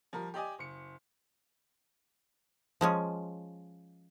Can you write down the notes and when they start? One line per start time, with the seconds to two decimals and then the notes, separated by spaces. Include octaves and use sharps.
0.13 F3 G3 A#4
0.34 G4 D5 D#5 G#5
0.59 F#1 C#7
2.81 F3 G#3 C#4